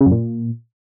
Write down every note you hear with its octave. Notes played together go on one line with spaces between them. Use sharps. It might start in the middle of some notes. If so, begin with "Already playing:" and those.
C#3
F#2
A#2